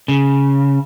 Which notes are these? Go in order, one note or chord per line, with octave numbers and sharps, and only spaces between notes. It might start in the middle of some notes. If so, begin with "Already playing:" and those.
C#3